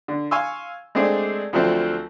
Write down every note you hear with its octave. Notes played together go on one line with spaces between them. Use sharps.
D3
F5 G#5 C6 C#6 E6
G#3 A3 C4 D4 G#4
D2 F3 F#3 A3 C4